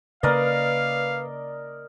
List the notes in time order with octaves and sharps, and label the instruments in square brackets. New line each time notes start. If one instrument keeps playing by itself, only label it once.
[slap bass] C#3 A#3 [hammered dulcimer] A#4 D5 D#5 [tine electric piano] B4 [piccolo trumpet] F5